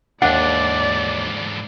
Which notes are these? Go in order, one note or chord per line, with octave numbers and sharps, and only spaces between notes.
D#2 G#2 D3 D4 D5 F#5